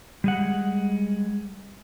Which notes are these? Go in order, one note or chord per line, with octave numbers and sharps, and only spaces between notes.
G3 G#3 F#5